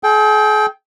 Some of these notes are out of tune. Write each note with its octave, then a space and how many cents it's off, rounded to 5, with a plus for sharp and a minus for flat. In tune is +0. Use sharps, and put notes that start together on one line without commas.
G#4 +45 G5 +0